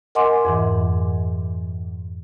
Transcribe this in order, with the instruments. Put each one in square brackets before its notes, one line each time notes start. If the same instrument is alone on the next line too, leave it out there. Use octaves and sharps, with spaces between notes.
[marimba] A#4 D#5 F#5 G#5 C6 D6
F2 G#2 E3